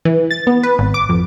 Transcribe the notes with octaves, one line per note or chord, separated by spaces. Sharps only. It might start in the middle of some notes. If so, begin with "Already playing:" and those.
E3
A6
B3
B4
G#1
D6
F2